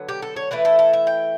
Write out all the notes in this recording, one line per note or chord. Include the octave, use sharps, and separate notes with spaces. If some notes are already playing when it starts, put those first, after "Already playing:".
Already playing: D3 F#3 B3
G4
A4
C#5
E3 A3 E4 B4
A4
A4
E5
G5